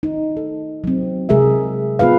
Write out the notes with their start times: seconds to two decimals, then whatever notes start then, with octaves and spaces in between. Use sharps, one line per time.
0.03 D#4
0.37 A4
0.84 F#3 C4
1.29 C3 G#3 G#4 A#4 E5
1.99 B3 F4 G#4 B4 F5